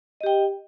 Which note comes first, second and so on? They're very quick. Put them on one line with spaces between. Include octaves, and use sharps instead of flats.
D#5 G4 G5